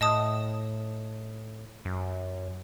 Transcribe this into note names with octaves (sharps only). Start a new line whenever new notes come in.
A2 D#5 A5 D#6
F#2